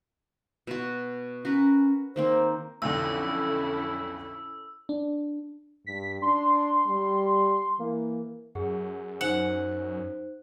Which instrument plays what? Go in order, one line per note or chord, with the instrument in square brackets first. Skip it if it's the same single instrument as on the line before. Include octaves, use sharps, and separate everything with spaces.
[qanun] B2 F#4
[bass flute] C#4 [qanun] F#4 A#4 B4
[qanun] D#3 A#3 C4 [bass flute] C5
[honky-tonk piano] B1 F2 D3 [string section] C#4 E4 A4 [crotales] E6
[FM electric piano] D4
[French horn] G2 [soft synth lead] B6
[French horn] D4 [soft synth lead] C6
[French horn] G3
[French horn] E3 [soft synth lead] A#3
[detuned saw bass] F#2 [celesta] G#4 F#5
[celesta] D#4 C5 [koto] F#5